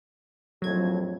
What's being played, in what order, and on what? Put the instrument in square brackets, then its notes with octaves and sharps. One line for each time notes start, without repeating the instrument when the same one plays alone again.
[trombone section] A#1 F2 A2 [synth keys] F#3 G#6